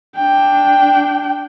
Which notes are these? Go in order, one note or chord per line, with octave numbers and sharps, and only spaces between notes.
D4 G5